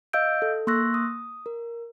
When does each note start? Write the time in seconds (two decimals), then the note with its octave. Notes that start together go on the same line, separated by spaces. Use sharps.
0.13 D#5 F5 E6 G6 D7
0.42 A4
0.67 A#3 C6 C#6 E6 F#6 A#6
0.94 D#6
1.46 A#4